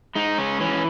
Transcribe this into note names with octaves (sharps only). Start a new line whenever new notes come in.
G#3 D#4
C#4
E3 C#4